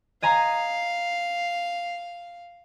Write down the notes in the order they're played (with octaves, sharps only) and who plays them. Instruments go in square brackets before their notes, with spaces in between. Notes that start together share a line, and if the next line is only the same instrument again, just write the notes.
[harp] D#5 G#5 A#5 [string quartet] F5